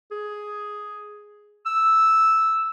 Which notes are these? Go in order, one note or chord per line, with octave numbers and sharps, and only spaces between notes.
G#4
E6